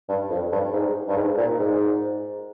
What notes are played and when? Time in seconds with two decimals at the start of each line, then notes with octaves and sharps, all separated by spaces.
0.09 G2
0.30 F2
0.52 G2
0.73 G#2
1.09 G2
1.16 G#2
1.37 A#2
1.59 G#2